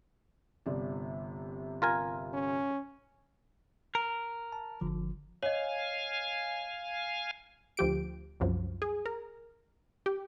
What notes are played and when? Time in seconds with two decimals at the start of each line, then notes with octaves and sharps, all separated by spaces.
0.66 G1 C3 D5
1.82 F4 A#4 G#5
2.33 C#4
3.95 A#4
4.52 A5
4.81 G1 D3 F3
5.43 C#5 D#5 F5 G#5
7.77 D2 F3 G4 D7
8.40 C2 F#2 F3
8.82 G#4
9.06 A#4
10.06 G4